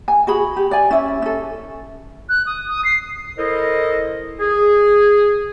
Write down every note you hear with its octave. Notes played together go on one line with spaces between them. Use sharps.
G#5
F#4 G#4 B5
G4
D5 G#5
C#4 E4 E5
C#4 A4
F#6
D#6
D#6
C7
E4 A4 A#4 C5 D#5
G#4